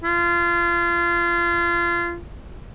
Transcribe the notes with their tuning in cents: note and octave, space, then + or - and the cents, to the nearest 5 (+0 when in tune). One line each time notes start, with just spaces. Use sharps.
F4 -25